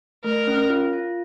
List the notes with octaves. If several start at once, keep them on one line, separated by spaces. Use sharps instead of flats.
A3 A#4
C#4
F4
F4